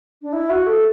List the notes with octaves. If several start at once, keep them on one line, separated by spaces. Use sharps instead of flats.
D4
E4
F#4
A4